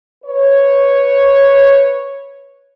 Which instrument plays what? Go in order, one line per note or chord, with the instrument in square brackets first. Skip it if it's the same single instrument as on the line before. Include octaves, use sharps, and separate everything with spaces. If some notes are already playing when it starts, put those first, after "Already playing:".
[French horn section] B4 C#5